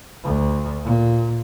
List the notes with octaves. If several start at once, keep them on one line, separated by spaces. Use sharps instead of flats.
D2
A#2